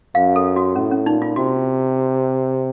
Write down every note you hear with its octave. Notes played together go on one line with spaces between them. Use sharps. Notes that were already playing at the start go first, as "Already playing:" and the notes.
F#2 F5
A4
F#4
A2 C#4
C#4
A#2 D#4
F4
C3 F#4